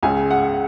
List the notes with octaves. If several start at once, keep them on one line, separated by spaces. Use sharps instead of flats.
C#2 C#3 G#5
F#5